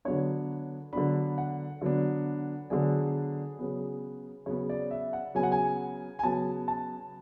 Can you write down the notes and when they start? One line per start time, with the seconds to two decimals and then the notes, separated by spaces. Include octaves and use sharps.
0.05 D3 F#3 B3 D4 C#5
0.93 D3 F#3 B3 D4 B5
1.38 F#5
1.81 D3 F#3 B3 D4
2.70 D3 F#3 B3 D4 G#4
3.59 C#3 F#3 B3
4.46 C#3 F#3 B3 C#5
4.69 D5
4.91 E5
5.13 F#5
5.35 C#3 F#3 B3 G#5
5.43 F#5
5.52 G#5
6.19 G#5
6.23 C#3 F#3 B3 A5
6.68 A5